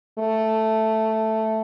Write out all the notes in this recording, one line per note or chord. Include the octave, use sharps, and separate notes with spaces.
A3